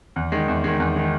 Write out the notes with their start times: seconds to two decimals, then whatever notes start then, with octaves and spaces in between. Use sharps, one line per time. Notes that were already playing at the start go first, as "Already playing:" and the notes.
0.16 E2
0.32 D#3 G#3
0.48 E2
0.64 D#3 G#3
0.80 E2
0.96 D#3 G#3